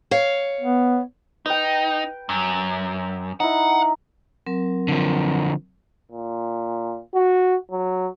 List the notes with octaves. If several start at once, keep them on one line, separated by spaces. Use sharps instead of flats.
C#5 F5
B3
D#4 B4 G5
F#2
D#4 E4 F#5
F#3 C4 A#4
D3 F3
A#2
F#4
F#3